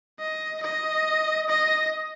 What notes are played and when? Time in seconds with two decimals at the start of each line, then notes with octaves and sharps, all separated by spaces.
0.19 D#5
0.62 D#5
1.49 D#5